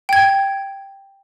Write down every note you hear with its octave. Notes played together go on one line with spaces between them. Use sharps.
G5 G#6